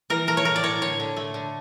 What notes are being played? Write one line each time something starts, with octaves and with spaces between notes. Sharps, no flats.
E3 A#4
A3 A#4
C#5
A2 A#4
D5
A2 C#5
D3 C#5
D3
A3
D3